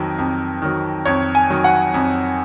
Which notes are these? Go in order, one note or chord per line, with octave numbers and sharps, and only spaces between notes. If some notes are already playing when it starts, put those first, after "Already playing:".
Already playing: F2 D#3 F#3
F2
D#3 F#3
F2 C#5
G#5
D#3 F#3
F#5
F2